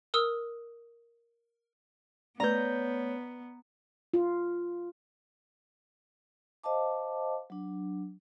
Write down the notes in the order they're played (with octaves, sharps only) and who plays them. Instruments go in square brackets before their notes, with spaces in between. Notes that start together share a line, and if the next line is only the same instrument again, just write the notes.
[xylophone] A#4 D#6 E6
[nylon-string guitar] A3 C#4 [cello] B3 [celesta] B4 D5 [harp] A#5 G6
[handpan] F4
[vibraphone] C5 D#5 F5 A5 D6
F#3 D4